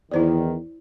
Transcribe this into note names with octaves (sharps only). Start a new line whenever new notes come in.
E2 D#3 E4 C5 D5